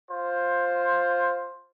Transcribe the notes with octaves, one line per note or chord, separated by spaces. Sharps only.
F4 C5